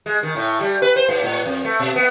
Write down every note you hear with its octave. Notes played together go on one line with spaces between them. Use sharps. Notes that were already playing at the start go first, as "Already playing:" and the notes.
G#3
D#3
A2
G3
B4
C5
G#2
A2
F2
A3
B2
B3